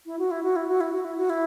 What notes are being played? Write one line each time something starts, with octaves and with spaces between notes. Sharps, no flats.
E4
F#4
E4
F#4
E4
F#4
E4
F#4
E4
F#4
E4